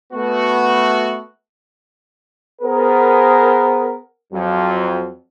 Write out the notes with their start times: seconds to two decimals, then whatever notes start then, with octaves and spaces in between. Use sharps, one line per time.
0.13 A3 B3 F#4
2.62 B3 G#4 A#4 C5
4.33 F2 F#3